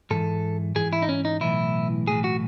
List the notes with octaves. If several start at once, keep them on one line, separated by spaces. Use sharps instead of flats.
G#2 E3 A4
G#2 E3 G#4
E4
D#4
C#4
D#4
B1 A2 E3 E4
B1 A2 E3 G#4
F#4